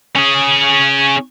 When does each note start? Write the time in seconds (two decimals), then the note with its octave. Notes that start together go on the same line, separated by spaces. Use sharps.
0.16 C#4 G#4